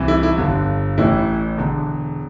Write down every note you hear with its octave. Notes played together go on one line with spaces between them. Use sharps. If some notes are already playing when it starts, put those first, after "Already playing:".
Already playing: C2 C3 E3
E4
E4
G1 G2 D3
A1 A2 E3 E4
E1 E2 D3